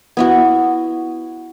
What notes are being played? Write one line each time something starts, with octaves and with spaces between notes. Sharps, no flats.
B3 E4 F#4